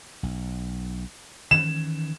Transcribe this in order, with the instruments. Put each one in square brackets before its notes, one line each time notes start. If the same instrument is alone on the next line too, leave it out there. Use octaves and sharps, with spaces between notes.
[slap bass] B1
[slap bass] D#3 E3 C#4 [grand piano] E7